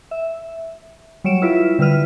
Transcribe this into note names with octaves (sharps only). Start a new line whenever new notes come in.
E5
F#3 G3 C#5 D7 E7
E4 F4 B4 E5
D3 G3 E4 B4 F6 D#7